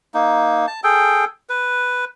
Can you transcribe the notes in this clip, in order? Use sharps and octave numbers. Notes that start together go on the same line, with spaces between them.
A#3 D#4
A5
G#4 A4 G5
B4